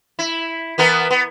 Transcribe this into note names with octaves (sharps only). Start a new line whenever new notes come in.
E4
E3 B3 A#4
B3